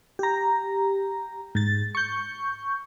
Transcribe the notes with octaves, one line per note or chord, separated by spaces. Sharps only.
G4 A#5
G#2 A6
C#6 G6